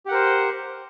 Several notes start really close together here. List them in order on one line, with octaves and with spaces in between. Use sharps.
G4 F#5 A#4 C5